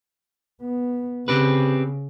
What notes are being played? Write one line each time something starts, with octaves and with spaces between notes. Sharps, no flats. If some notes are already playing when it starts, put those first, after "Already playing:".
B3
C#3 C4 G4 B4